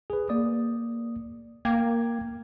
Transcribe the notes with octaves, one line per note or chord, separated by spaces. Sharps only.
G#4 B4
A#3 D5 D#6
A#3 G5 D6 G#6